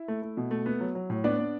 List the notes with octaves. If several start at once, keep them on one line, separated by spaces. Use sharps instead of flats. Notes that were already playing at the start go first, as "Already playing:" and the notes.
Already playing: E4 E5
A3
A3
B2
A3
B3
F#3
F#3
A2
B3 D4 D5
B3